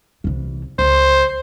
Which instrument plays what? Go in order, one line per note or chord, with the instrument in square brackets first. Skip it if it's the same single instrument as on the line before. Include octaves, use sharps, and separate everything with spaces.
[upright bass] C2 E3
[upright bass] C#2 [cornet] C5